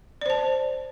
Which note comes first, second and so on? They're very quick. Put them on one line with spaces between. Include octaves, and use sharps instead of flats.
D5 C5 A5